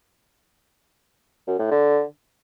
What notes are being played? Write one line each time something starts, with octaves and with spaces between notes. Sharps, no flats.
F#2
A2
D3